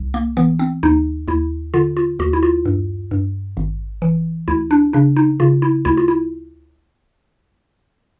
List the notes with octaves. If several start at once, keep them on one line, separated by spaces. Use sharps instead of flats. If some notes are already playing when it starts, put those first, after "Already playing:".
Already playing: C2
A#3
E3 B3
C4
D#2 D#4
D#2 E4
D3 F4
F4
D#2 F#4
E4
F4
G2
G2
G#1
E3
D2 E4
D4
C#3 D4
D#4
C#3 F4
E4
D2 E4
F4
E4